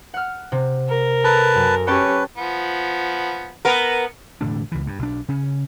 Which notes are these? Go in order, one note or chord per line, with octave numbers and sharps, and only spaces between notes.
F#5 F6
C3
A#4
A4 B4 A5 A#5
F#2
C#4 G4 B4 C#5 G5 A5
F3 B3
B3 A#4
E1 A2 D3 D4
C#2 E3
G2
B1 D4
C#3 C#4